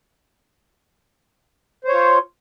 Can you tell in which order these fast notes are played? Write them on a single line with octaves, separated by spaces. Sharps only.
C5 C#5 F4